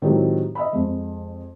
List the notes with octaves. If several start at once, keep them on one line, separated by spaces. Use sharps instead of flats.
A2 D#3 F#3 G#3 C4 G4
D#5 E5 B5
F2 G#3